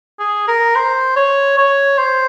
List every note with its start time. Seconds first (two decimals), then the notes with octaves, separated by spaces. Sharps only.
0.19 G#4
0.48 A#4
0.76 C5
1.16 C#5
1.58 C#5
1.98 C5